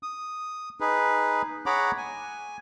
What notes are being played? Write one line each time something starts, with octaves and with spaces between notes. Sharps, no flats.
D#6
D#4 G#4 B4
G#4 C#5 F#5 A#5 B5 D6
G#5